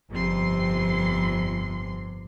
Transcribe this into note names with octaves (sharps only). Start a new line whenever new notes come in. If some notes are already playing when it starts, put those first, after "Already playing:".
G1 F2 C3 C6